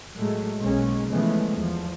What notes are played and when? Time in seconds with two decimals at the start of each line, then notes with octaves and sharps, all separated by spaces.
0.18 A2 F#3 G#3 A3
0.60 B1 G#3 A#3 C#4
1.10 C#3 E3 F3 G#3 A3 B3
1.57 E2 F3